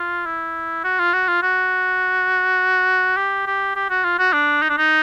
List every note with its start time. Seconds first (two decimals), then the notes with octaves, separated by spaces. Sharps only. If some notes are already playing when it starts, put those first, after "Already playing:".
Already playing: F4
0.26 E4
0.84 F#4
0.99 F4
1.13 F#4
1.28 F4
1.43 F#4
3.17 G4
3.47 G4
3.76 G4
3.90 F#4
4.04 F4
4.19 F#4
4.33 D4
4.62 D#4
4.69 D4
4.78 D#4